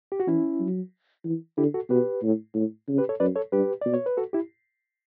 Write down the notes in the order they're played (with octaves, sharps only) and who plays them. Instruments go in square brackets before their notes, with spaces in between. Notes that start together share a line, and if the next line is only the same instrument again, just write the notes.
[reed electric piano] G4
F#4
[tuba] E3 [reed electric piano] C#4 E4
[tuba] F#3
E3
[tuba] D3 [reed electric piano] E4 G4
[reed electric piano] F#4 A4
[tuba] B2 [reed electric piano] G4 B4
[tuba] A2
A2
C#3
[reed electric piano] G4 B4
A4 C#5
[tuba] F#2 [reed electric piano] B4 D5
[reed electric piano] A4 C#5
[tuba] G2 [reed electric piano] G4 B4
[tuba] B2 [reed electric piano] D5
[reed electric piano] C#5
B4
F#4 A4
E4 G4